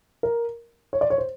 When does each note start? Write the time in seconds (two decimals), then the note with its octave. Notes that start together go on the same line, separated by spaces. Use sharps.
0.23 A#4
0.93 C#5
1.01 D5
1.10 C#5
1.18 C5